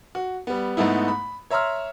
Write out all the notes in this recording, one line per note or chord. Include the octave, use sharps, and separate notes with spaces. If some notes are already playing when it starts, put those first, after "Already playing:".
F#4
G3 B3
G#2 A3 B3 D#4 E4
B5
C#5 E5 A#5 C6 E6 F6